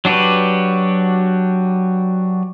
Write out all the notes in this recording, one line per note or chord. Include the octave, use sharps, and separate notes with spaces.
F#3 D4 F#4 G4 B4